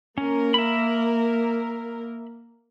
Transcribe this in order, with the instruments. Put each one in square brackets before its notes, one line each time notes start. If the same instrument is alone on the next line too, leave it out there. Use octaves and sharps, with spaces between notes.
[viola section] A#3 A#4 [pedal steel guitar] C#4
[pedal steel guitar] E5 B5